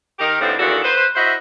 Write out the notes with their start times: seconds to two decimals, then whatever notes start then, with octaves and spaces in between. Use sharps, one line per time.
0.19 D#3 D#4 G4 A#4
0.41 A2 F3 G3 B3 C4 D4
0.59 E2 A#2 D3 D#3 F#4 A4
0.84 B4 C5
1.15 E4 F#4 C5 D#5 E5